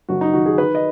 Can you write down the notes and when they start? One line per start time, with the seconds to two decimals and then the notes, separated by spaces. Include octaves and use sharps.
0.09 F#1 F#4
0.21 D#4
0.33 D#3 F#4
0.46 G#4
0.58 D#3 B4
0.75 D#5